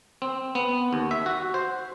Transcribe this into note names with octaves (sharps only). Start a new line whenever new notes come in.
C4
B3
D#2
E5
F#4
C5